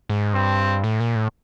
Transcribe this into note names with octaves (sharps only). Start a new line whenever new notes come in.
G#2
G2 C4
A2
A#2
A2